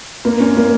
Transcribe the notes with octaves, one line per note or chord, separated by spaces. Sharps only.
A#3
C#4
A#3